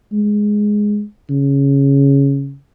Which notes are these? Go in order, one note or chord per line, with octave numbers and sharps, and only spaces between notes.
G#3
C#3